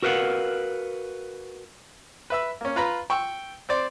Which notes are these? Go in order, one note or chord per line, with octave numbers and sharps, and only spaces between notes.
F#4 A#4 B4 F5 F#5
B4 E5 E6
A#3 C#4
F4 B4 A#5 B5
G5 C#6 E6
C4 C5 D5